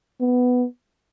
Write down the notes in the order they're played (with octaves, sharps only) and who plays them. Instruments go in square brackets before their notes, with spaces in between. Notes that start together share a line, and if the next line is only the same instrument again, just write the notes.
[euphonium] B3